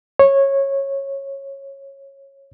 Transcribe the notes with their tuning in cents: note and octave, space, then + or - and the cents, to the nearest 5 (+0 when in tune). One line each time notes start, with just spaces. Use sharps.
C#5 -15